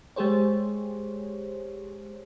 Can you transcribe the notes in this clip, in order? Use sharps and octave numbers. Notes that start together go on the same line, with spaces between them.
G#3 G4 G#4 C5 C#5